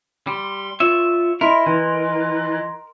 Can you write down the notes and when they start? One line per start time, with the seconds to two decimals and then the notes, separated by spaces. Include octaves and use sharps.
0.27 G3 C6
0.80 F4 C#5 E5
1.41 E4 A#4 D#5 C6
1.66 E3